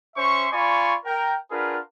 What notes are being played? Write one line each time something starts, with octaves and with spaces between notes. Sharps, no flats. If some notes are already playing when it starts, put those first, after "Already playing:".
C#4 C5 E5 C6 C#6
F4 D5 G#5 B5 C#6
A#4 G5
D4 F4 G#4 A#4 B4 F#5